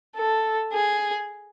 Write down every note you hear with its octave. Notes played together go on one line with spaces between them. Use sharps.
A4
G#4